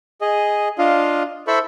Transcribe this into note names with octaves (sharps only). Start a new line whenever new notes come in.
G#4 D#5
D4 F4 D#5 F5
E4 A4 C5 E5 B5 C#6